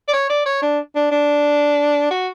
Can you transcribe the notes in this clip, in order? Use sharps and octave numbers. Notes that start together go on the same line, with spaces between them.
D5
C#5
D5
C#5
D4
D4
D4
F#4